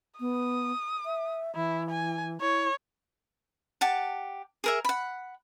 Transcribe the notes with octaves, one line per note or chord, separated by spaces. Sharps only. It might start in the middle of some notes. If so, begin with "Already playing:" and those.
B3 D#6
E5
E3 E4
G#5
E4 C#5
G4 F#5 A5
G#4 A#4 E5
F#5 B5